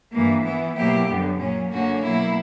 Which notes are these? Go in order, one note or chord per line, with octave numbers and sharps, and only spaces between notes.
G2 E3 A#3
E3 B3 E4
B2 F#3 A#3 E4 G4
F#2 D3 G3 B3
A#2 F#3 C#4
F#2 D3 A#3 C#4 F#4
B2 F#3 A#3 E4